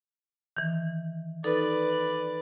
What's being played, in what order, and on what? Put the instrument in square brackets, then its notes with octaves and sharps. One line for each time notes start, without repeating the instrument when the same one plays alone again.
[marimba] D#3 E3
[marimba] D#4 A4 [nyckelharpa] B4 D5